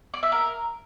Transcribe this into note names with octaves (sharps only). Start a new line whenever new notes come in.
D5
E5
A#4